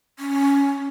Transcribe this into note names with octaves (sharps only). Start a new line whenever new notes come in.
C#4